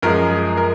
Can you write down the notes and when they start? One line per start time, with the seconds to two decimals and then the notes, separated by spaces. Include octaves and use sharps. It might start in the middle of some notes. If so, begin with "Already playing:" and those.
0.02 F#2 F3 G#3 A#4
0.30 G#4
0.57 A#4